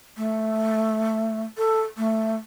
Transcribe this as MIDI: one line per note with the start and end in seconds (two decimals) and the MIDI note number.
0.17 1.42 57
1.58 1.82 69
1.97 2.35 57